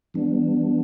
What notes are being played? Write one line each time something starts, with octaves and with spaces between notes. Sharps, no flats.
E3 G3 B3 D4